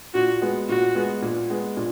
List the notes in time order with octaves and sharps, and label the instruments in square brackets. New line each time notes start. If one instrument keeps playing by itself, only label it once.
[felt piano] A#2 [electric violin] F#4
[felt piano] G#3 B3
[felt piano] A#2 [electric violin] F#4
[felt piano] G#3 B3
A#2
G#3 B3
A#2